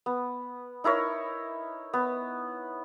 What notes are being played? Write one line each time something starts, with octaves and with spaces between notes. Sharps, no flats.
B3
D#4 E4 A#4 C#5
B3